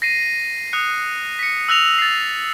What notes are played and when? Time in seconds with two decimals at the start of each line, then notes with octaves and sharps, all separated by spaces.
0.02 A#6 C7 D#7
0.73 D#6 F#6 C#7
1.39 B6 C#7
1.69 E6 F#6 A#6 F7
1.98 A6 C7